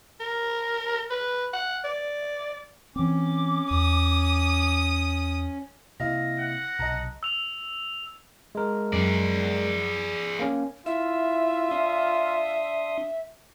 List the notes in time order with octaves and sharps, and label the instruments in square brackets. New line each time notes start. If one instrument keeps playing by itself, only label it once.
[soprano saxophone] A#4
B4
F#5
D5
[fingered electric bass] E3 C4 [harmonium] C#4 [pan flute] D6
[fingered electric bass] E2 [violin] D#6
[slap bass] C3 A#3 [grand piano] E4 D#5 F5 [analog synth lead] A#6
[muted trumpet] F#5
[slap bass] B1 C3 [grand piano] D#5 A5 A#5
[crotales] E6 F7
[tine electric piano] G#3 A#4
[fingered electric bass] F#2 [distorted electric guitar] G#4 D5
[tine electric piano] A#3 C#4
[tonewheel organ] E4 E6 [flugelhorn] F4 [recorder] E5
[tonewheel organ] D4 C6 D#6